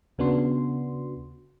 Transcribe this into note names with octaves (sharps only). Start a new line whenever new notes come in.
D#2 C#3 B3 D4 F#4 C6